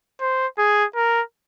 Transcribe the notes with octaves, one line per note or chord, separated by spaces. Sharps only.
C5
G#4
A#4